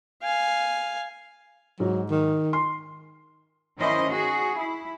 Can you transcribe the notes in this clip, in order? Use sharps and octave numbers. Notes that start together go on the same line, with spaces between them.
F5 G#5
G#2 F#3
D#3
C6
D#3 C#4 E4 C5 D#5
F#4 G#4
E4